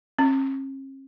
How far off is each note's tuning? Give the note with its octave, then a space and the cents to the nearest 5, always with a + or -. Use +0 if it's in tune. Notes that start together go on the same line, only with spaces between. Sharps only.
C#4 -45